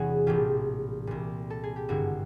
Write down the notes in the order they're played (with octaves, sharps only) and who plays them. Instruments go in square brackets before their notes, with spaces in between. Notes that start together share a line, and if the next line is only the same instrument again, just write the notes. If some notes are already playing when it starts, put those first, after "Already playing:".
Already playing: [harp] E1 E2 C3 F#4 G#4
A#1 A2 E3 F4 G4
C2 A#2
A4
G#4
G4
G#1 G2 D3 E4 F#4